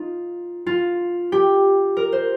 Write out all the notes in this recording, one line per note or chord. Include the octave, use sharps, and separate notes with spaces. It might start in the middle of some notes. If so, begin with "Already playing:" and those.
Already playing: D#4 F4
F4
G4
A#4
C5